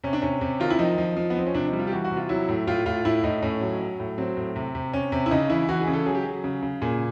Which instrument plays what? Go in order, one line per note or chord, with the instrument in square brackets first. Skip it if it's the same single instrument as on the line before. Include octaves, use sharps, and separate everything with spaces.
[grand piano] C3 C#4
D4
C3 C#4
C3
D#3 F4
E4
F3 D#4
F3
F3
B3
F3 C4
C#4
C3 D4
D#4
G3
F4
G4
E3 F#4
F#4
C3
F4
F#3 E4
A2
A2 F4
A2 F4
A2 E4
A2 D#4
A2 C#4
F#3
F#3
A2
F#3 C4
A2
C3
C3
C3 C#4
C3
E4
C#3 D#4
E3 E4
E3 F#4
G#4
C#3
A4
F#3 G#4
G4
F#3 G#4
C#3
C#3
A#2 G#4